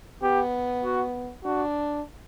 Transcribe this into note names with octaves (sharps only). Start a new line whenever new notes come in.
B3 G4
F#4
D4 F#4